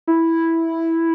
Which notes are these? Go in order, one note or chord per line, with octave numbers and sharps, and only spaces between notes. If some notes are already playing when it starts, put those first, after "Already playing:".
E4